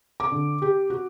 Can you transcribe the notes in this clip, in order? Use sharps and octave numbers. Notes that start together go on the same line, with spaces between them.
D6
D3
G4
F#4